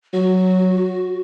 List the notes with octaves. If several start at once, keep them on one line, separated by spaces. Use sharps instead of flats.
F#3 F#4